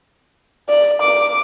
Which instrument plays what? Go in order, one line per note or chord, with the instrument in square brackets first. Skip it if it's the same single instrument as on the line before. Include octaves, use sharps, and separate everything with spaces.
[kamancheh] D5
D6